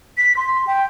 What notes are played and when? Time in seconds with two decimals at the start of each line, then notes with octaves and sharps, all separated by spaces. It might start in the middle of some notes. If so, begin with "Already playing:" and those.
0.18 B6
0.37 C6
0.67 G5